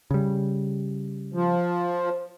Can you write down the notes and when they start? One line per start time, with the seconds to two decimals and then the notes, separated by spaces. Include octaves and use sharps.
0.11 C#3 G3
1.34 F3